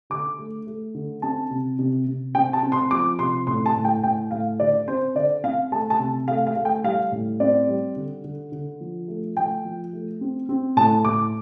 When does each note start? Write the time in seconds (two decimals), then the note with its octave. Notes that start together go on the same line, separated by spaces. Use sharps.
0.10 D3 D6
0.38 A3
0.67 A3
0.95 D3
1.22 C4 A5
1.50 C3
1.79 C3
2.07 C3
2.35 C4 G5
2.53 A5
2.63 C4
2.72 C6
2.91 F3 D6
3.19 C3 C6
3.47 A2 C6
3.66 A5
3.75 A2
3.85 G5
4.03 A2 G5
4.31 A2 F5
4.60 D3 D5
4.87 C4 C5
5.15 D3 D5
5.43 C4 F5
5.72 A3 A5
5.90 A5
5.99 C3
6.27 A3 F5
6.47 F5
6.56 A3
6.65 G5
6.84 G3 F5
7.12 A2
7.40 C4 D5
7.68 G3
7.96 D3
8.24 D3
8.52 D3
8.80 F3
9.08 A3
9.36 A3 G5
9.65 F3
9.93 A3
10.21 C4
10.49 C4
10.77 A2 A5
11.05 A2 D6